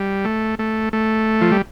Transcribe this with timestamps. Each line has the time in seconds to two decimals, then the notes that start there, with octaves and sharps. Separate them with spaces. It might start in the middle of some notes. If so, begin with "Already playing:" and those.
Already playing: G3
0.25 A3
0.59 A3
0.93 A3
1.41 F3
1.52 G3